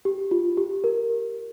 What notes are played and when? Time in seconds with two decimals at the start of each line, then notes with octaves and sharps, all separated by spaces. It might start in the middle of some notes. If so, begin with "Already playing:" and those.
0.05 G4
0.31 F4
0.57 G4
0.84 A#4